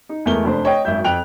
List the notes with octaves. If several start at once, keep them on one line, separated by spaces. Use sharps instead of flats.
D#4
E2 G#3 A3 A#4 G7
F1 D4 C5
C#5 D#5 G5
G#1 F#2 E5 G6
F2 G5 F#6 F7